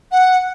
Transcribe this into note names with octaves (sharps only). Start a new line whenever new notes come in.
F#5